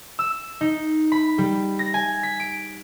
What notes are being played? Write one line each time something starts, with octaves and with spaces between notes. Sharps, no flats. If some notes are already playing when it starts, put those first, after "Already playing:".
E6
D#4
B5
G3
A#6
G#5
B6
D7